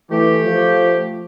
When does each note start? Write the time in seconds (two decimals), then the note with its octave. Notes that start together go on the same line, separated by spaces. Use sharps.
0.11 E3 A3 G4
0.45 F3